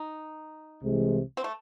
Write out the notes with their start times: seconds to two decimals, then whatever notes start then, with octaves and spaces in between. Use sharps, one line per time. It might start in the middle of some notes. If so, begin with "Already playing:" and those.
Already playing: D#4
0.82 C2 C3 E3 G#3
1.37 C4
1.44 A3